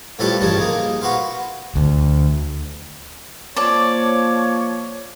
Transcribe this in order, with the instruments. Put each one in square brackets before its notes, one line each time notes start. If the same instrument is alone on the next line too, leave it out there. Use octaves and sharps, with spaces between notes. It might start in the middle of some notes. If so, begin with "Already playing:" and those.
[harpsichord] A2 F3 G3 A4 B4 A5
A1 G2 C#3 F3 D#4 A5
G#3 A#3 D#4
F#4 B4 C5 F5
[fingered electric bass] D2
[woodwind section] F3 A#3 C#5 [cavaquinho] D5 A5 D6